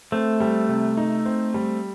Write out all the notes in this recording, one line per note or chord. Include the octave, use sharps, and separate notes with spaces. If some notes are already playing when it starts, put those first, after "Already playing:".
A3 C4
G3
C3
D#4
C4
G3